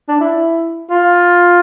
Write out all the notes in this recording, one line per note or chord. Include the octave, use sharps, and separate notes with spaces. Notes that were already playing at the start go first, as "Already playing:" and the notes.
D4
E4
F4